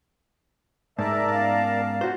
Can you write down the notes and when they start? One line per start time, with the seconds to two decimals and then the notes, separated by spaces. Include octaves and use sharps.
0.99 G#2 A#4 D5 E5 A5
1.32 B3 C#4 F5
2.01 F#4 C5